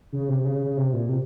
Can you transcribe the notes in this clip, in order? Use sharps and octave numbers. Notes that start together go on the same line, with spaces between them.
C#3
C3
C3
C#3
C#3
C#3
C3
A#2
C3